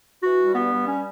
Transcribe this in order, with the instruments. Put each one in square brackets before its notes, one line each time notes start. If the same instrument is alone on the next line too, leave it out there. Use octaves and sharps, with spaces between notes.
[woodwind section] E3 F#4
G3
G2 B3
G3
C#4